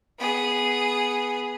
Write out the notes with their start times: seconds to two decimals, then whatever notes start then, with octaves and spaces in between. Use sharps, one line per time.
0.19 B3 G#4